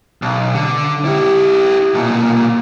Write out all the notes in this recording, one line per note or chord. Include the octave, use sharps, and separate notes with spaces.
B1
D3
E4 G4
B1 A#2